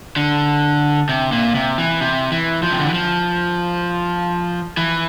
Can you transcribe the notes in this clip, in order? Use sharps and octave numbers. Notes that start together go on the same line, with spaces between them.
D3
C3
A#2
C3
E3
C3
E3
F3
C3
D3
E3
F3
E3